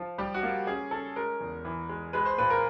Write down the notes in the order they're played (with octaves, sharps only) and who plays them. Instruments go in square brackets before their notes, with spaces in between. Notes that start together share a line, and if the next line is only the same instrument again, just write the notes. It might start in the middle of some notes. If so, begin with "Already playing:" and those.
Already playing: [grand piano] F3
G3 G4
F#4
A#3
C#4 G#4
C#4 A4
G#3 A#4
E2
E3
G#3
G#3 B4
C5
A#2 B4
A#4